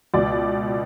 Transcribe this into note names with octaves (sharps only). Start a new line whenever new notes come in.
C#2 B2 D5